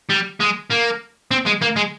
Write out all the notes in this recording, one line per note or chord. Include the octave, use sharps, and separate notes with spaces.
G3
G#3
A#3
C4
G#3
A#3
G#3